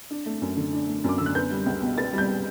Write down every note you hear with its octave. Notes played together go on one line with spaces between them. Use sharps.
D4
A3
F#2
D3
D4
A3
F#2 D6
D3 E6
F#6
B3 G6
G3
C#2
B2
B3 A6
G3 G6